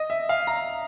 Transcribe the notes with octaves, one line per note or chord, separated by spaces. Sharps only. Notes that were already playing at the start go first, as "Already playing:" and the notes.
Already playing: D#5
E5
F5
A#5